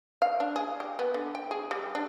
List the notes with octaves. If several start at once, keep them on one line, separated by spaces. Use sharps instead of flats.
F5
D4
G#4
G4
B3
D3
G5
G#4
G3
D4